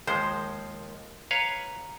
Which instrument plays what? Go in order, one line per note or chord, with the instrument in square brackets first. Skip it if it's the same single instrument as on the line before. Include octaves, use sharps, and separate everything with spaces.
[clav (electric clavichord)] D#2 F3 G#3 [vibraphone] A#4 [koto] C5
[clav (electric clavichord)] B4 C#5 F5 [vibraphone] A#5